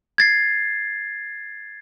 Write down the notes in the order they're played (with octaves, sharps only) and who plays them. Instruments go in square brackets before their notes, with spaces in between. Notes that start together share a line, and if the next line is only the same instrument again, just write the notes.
[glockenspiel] G#6 A6 C7